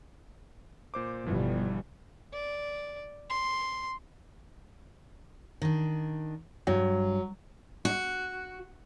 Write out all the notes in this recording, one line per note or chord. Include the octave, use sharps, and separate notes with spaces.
A#2 C5 D6
G1 B2 E3 F3 G3
D5
C6
D#3 D4
G2 F#3
F#4